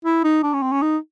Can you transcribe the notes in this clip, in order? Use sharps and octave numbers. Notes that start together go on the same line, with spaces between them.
E4
D#4
D4
C#4
C4
C#4
D#4